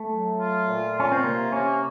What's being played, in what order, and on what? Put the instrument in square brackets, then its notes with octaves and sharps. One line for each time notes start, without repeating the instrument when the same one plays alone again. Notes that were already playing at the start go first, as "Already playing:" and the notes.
Already playing: [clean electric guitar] A3
[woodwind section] F#3
F4
A#2
[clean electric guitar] C#4 [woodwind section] F4
[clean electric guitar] C4
[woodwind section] C3 [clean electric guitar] A#3
[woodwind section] A#3 [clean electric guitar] C#4